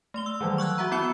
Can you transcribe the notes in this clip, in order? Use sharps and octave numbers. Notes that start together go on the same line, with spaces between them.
A3 C6 G7
E6
D#3 E3 F#3 G3
C#6 E6 F#6 G#6
F#4 E5 F#5 A#5
B3 E4 B5 E6 C#7 G7